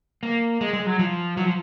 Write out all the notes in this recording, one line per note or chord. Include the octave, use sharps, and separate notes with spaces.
A#3
G#3
G#3
F#3
F3
F#3
F3